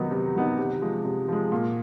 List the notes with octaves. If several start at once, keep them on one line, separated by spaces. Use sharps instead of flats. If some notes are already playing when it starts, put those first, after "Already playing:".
Already playing: C3 D#3 F#3 B3 D#4
C3
D#3 F#3 B3 D#4
C3
F3 G#3
C3
F3 G#3
A#2